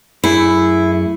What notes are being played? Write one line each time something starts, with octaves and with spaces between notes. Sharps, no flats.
F#2 A3 E4 G#4